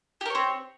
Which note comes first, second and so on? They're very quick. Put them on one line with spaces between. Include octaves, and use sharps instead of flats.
G4 A#4 C#5 C4